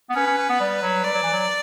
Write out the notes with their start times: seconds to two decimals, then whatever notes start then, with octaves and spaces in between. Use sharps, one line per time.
0.09 B3
0.15 C#4 B4
0.27 C#4
0.38 C#4
0.49 B3
0.60 G3
0.82 F#3
1.04 G3 D5
1.14 F#3
1.23 E3
1.33 F#3